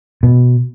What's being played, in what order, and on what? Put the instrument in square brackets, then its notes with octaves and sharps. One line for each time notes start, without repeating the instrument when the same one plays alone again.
[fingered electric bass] B2